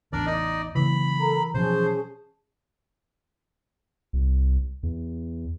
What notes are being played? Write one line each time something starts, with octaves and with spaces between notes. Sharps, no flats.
A1 E2 D4 A#4 D5
D#4 D5 D#5
C#3 E3 F#3 A#3 B5
A4 A#4 A#5
B2 F3 F#3 C#4 G#4 C5 A5
C2
E2